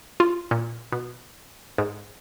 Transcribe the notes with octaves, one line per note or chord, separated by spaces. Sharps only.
F4
A#2
B2
G#2